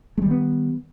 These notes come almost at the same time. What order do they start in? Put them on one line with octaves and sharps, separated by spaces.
G#3 G3 D#3 B3